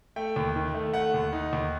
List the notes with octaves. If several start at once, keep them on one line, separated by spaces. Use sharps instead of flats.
A3 G5
D#2
D#3
A3
A3 F#5
D#2
D#4
D#2